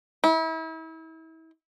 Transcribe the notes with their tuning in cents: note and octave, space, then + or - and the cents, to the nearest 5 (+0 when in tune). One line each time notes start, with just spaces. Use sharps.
E4 -35